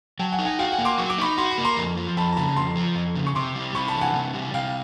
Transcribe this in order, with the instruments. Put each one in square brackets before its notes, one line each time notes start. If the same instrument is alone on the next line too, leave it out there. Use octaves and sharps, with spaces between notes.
[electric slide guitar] F#3 [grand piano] G5 A5
[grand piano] F#5 G#5
[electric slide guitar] D#4
[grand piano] F#5 G#5
[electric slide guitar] F#4 [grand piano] F5 G5
[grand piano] F#5 G#5
[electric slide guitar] A#3
[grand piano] C6 D6
[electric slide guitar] F#3 [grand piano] C#6
[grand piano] D6
[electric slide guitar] D#4 [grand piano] B5 C#6
[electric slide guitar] F#4 [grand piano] C6
[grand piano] B5
[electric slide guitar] A#3
[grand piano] A#5 C6
[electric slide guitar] F2
F3
[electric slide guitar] F2 [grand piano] A5 B5
[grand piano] A#5
[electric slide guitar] C#3 [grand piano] A5 B5
[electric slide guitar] F2 [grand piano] A#5 C6
[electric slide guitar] F3
F2
C#3
[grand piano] C#6
[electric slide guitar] C3 [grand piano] C6 D6
[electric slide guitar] G3
[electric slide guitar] C3 [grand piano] B5 C#6
[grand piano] A5 B5
[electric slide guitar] E3
[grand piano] F#5 G#5
[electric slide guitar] C3
G3
[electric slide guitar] C3 [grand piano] F5 G5